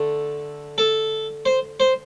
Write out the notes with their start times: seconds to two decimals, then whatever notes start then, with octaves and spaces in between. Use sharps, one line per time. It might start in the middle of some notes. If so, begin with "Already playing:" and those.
Already playing: D3 A3
0.78 A4
1.45 C5
1.80 C5